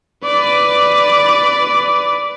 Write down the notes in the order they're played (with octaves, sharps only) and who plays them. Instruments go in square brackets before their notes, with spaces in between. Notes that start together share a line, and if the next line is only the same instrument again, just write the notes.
[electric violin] B4 D5